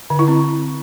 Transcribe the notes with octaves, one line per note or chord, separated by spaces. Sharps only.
D3
E4
C4